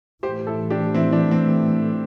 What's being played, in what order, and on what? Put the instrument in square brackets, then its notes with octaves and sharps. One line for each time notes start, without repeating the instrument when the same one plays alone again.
[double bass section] A2 E3 A3 [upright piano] G4 C5
[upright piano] E4 A4
D4 G4
C4 E4
D4
C4